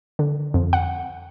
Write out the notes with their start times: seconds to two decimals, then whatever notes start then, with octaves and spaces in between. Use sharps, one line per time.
0.19 D3
0.54 F2
0.73 F#5